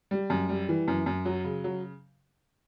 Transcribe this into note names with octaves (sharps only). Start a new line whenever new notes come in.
G3
F#2
G3
E3
F#2
F#2
F#3
C#3
F#3